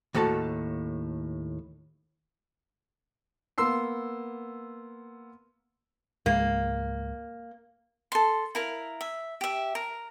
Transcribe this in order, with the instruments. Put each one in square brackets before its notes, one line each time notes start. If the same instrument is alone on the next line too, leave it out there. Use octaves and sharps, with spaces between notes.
[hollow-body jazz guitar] D#2 A2 F#4 A4 A5
[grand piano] A#3 B3 C6 E6 C7
[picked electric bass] C#2 G#2 G#3 [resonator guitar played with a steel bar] A#3
[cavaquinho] A4 C6
E4 A#4 F5
E5
G4 E5
A#4